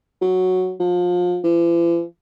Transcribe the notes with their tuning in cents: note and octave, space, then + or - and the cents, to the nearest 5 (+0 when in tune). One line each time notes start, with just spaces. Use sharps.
F#3 -5
F3 +30
E3 +45